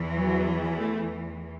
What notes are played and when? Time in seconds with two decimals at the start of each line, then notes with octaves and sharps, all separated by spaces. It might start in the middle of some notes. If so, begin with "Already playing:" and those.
Already playing: E2 E3
0.15 F#3
0.77 A3